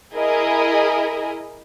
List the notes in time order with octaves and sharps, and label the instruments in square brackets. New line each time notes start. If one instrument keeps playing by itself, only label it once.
[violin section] E4 G#4 A#4 D#5